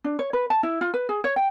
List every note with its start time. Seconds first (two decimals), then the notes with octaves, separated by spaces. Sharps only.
0.04 D4
0.19 C#5
0.33 B4
0.50 A5
0.63 E4
0.81 F4
0.94 B4
1.09 G#4
1.24 C#5
1.36 G5